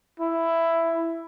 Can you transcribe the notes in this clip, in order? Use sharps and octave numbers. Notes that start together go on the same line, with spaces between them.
E4